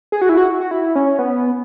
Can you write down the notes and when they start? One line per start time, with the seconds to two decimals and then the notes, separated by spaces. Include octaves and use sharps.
0.12 G#4
0.22 F#4
0.29 E4
0.37 F#4
0.61 F#4
0.71 E4
0.95 C#4
1.19 B3